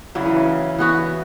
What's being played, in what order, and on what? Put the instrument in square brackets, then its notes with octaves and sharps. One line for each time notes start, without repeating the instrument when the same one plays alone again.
[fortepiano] C#3 [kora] F#3 E4
[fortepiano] E3
C#3
[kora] E3 B3 F#4